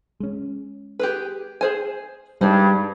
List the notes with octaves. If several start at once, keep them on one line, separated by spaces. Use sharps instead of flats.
G#3 C#4
G4 G#4 B4
G#4 C5 G#5
G2 G3 G#3 D#4 C5